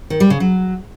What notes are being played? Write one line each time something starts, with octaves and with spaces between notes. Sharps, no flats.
D#3
G3
C#3
F#3